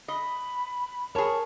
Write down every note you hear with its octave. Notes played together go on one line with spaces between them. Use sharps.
D#5 B5
G#4 A#4 C#5 A5